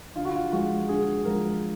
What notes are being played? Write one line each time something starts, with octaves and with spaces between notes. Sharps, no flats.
D3 F4
F#4
F4
F3 G#3 F#4
D3 G#4
F3 G#3 A#4